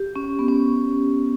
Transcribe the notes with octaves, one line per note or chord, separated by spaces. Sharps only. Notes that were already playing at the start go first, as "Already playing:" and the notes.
Already playing: G4
C#4
B3
C#4